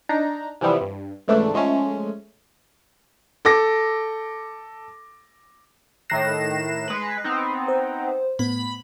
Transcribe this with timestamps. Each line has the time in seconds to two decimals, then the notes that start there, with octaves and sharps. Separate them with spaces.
0.09 D4 D#4 A#5
0.61 C3 E3 F3 G3 B3 E4
0.81 G2
1.28 C#2 G#2 E3 A3 D4
1.54 F3 G#3 A3 C#4
3.45 A4 D6 A#6
6.10 A2 D#3 F#6 A#6 C7 E7
6.88 G#3 B4
7.24 B3 C4 D#4
7.68 C5
8.39 A2 B3 B5